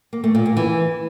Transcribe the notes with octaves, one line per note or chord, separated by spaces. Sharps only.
A#3
A3
A#2
A#3
E3